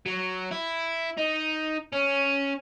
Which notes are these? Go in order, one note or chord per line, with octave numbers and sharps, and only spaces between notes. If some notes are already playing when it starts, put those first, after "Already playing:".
F#3
E4
D#4
C#4